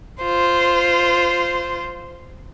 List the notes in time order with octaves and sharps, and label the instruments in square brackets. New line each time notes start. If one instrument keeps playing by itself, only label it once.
[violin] F4 C5